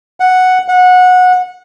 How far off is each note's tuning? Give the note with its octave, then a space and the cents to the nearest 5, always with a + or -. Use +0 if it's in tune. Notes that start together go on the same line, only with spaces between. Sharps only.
F#5 +0
F#5 -20